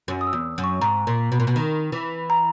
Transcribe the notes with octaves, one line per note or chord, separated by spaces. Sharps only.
F#2
D#6
E6
E2
F#2
C#6
G#2 A#5
A#2
B2
A#2
B2
D#3
E3
A#5